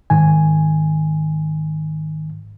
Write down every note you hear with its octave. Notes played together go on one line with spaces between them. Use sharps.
G#2 D#3 G#5